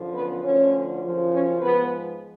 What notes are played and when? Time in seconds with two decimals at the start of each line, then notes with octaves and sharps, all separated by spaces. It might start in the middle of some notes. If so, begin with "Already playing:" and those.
Already playing: F#2 D3 F3
0.15 B3 B4
0.44 D2 D3 F3 C#4 C#5
1.03 F#2 C#3 F3
1.32 C#4 C#5
1.61 G#2 F3 B3 B4